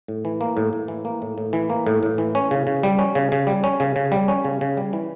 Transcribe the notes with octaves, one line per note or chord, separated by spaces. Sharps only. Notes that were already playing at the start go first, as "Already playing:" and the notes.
A2
E3
A#3
A2
A2
E3
A#3
A2
A2
E3
A#3
A2
A2
E3
C#4
C#3
C#3
G3
C#4
C#3
C#3
G3
C#4
C#3
C#3
G3
C#4
C#3
C#3
G3
E3